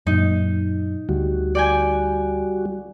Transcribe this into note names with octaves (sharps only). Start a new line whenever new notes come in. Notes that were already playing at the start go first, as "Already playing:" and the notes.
F#2 A#2 D#4
D2 G3 F#4
D5 G5 G#5